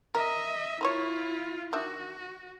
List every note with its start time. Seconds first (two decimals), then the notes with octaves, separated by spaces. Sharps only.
0.15 A#4 D#5 E5
0.81 E4 F4 A#4 C5 C#5
1.73 D#3 D4 F#4 E5